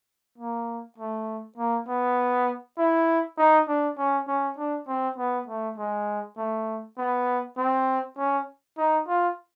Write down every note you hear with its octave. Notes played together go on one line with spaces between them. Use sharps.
A#3
A3
A#3
B3
E4
D#4
D4
C#4
C#4
D4
C4
B3
A3
G#3
A3
B3
C4
C#4
D#4
F4